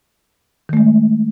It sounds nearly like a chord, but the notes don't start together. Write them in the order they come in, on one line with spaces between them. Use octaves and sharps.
D#3 A3 G#3